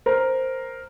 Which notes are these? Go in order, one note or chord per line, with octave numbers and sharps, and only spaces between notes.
A#4 C5